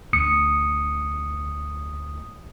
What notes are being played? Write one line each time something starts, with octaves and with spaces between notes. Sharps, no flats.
D2 D#6 C#7